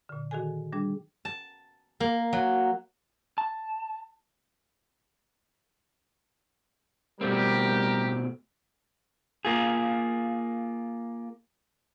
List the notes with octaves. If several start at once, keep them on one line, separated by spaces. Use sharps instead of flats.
A#2 D3
D#3 F#4 G#4 A4 G#5
G3 D4 G#4
A5
A#3
F#3
A5
B2 G3 A3 C4 G4 A#4
A#3 F4 G#4